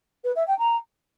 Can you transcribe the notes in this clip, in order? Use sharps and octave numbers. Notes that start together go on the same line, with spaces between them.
B4
E5
G5
A#5